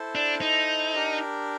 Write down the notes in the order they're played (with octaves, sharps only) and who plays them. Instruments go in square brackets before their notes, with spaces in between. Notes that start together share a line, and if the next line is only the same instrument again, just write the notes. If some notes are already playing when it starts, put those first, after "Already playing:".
Already playing: [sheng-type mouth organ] E4 A4 C5
[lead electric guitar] D4
D#4
[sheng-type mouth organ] D4 G4 A#4